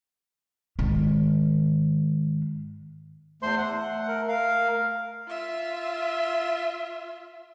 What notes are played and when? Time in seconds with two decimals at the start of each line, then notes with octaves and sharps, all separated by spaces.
0.79 G#2 D#3
3.43 E2 A3 C5 C6
3.58 F#5
4.08 A#4
4.28 A#4 F5
5.28 F4 E5